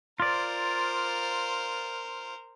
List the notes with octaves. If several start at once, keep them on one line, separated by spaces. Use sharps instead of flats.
F4 A#4 C5 D5